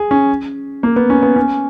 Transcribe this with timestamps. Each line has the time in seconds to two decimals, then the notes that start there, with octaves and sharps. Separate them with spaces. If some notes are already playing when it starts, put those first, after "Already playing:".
Already playing: G#4
0.11 C#4
0.83 A#3
0.96 B3
1.10 C#4
1.23 B3
1.36 C#4